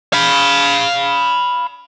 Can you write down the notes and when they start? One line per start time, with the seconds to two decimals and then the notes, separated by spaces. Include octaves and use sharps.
0.13 F5 B5